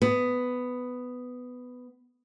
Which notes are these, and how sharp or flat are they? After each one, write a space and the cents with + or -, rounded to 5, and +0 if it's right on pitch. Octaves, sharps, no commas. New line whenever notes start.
B3 +10